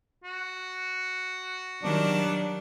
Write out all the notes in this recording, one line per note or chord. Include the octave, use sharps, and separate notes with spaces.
F#4
D#3 F#3 G3 D4